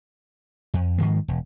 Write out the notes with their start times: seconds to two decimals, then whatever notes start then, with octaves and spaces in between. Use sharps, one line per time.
0.74 F2
0.98 G#2 D#3 F3 G#3
1.28 E1